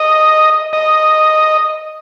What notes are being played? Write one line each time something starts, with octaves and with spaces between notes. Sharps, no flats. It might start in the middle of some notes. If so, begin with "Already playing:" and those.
Already playing: D#5
D#5